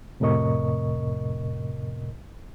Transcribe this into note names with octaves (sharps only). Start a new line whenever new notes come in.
F2 A2 C3 A#4 D#5 C#6